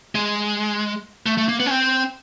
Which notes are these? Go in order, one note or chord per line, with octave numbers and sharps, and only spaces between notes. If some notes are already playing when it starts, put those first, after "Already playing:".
G#3
A3
A3
A#3
B3
C#4
C4